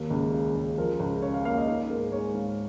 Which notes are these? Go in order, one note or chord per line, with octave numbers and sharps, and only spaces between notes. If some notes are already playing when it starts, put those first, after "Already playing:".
Already playing: D#2 A#3
C#2
C#3
C#2
F3 A#4
C#2
C#3 C#5
F5
A#3 F5
D#5
D#4 A#4
G#2 A#4
G#3 C#5
G#2 F5